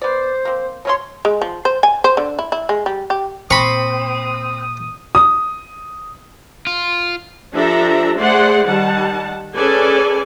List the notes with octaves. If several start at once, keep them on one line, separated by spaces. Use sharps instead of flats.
B3 C5 D5
A#3 C4
B2 C#4 C#5 C6
G#3
F3
C5
G#5
C5
D3
E4
E4
G#3
G3
G4
A#2 C4 B5 C#6 D#6
D#6
F4
F3 D4 G4 A4 E5 A#5
A3 G#4 C5 D5 F#5 C6
D#3 G3 F#5 A5
C#4 G#4 A4 B4 D5 G#5